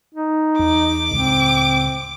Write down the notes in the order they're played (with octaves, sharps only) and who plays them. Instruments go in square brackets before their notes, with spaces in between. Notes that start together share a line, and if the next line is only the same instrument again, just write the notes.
[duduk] D#4
[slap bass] E2 [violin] D6
[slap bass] C#2 A2 [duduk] C4